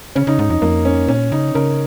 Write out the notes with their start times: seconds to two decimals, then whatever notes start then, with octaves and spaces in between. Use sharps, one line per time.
0.15 C#3 C#4
0.27 C#3 D#4
0.39 G#2 D#4
0.50 F2 D#4
0.62 F2 A#3
0.85 C#4
1.08 A#2 C#4
1.32 C#3 D#4
1.55 C#3 A#4